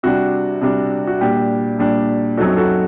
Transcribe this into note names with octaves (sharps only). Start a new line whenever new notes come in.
C3 G3 D4 F#4
C3 G3 D4
F#4
A#2 G3 D4 G4
A#2 G3 D4
F#2 F#3 C4 D#4 F#4 A4
F#4 A4